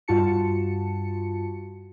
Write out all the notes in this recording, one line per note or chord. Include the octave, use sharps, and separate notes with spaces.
G2 F4 F#4 A5 C#7